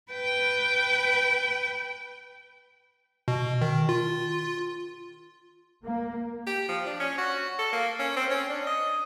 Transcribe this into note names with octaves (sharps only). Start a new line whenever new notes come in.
B4 G5
B2
D#3
F4
A#3
G4
F3
D4
C#4
F#4
A4
A#3
C#4
C4
C#4
D4
D#5